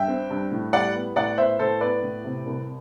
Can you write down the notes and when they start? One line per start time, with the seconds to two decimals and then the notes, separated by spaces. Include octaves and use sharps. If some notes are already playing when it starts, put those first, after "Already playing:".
Already playing: G2 E5 G5
0.08 C4
0.30 G2
0.51 A2
0.73 G3 D5 F#5
0.95 B3
1.16 A2 D5 F#5
1.38 B3 C5 E5
1.59 A2 A4 C5
1.81 B3 B4 D5
2.03 A2
2.24 C3
2.46 C2